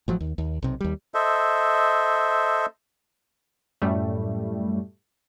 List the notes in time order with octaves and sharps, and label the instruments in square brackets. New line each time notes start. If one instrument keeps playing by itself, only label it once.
[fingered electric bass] A1 F3 F#3
D#2
D#2
B1 C3
D#2 G3
[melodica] A4 C5 D#5 E5
[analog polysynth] F#2 A2 G3 A3